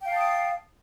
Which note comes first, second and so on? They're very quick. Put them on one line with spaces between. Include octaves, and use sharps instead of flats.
G5 F5 A5 D#6